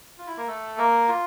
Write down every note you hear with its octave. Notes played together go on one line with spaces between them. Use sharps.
F4
E4
A#3 A#4
A3 A4
A#3 A#4
F4